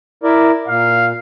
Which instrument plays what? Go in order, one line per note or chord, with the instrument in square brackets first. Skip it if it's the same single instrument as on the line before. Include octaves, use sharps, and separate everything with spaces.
[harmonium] E4 A#4 D5
[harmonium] A#2 [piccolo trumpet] F5